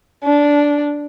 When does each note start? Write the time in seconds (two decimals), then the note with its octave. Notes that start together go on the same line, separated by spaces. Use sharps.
0.24 D4